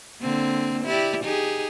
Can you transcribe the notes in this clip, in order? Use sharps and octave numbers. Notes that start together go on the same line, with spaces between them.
D3 A#3 C4
E4 G4 D5
D#4 G4 G#4